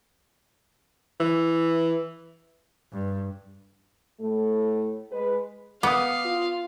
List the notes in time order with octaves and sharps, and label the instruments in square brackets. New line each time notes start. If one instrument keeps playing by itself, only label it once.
[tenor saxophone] E3
[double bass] G2
[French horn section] A2 A3
G#3 B4
[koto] B3 [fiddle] F5 [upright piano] D6 D#6
[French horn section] F4